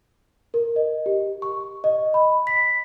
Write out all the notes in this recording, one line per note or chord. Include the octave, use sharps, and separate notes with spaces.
A#4
D#5
G4
C#6
D#5
B5
B6